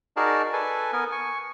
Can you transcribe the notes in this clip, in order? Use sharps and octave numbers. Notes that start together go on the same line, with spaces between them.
D#4 F#4 G#4 A#4 D5 A5
A4 B4 G#5
B3 A#4 G#5
G#5 C#6